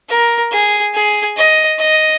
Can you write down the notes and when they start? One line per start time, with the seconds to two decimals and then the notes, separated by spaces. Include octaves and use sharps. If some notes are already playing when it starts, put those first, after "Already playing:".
0.09 A#4
0.52 G#4
0.94 G#4
1.37 D#5
1.79 D#5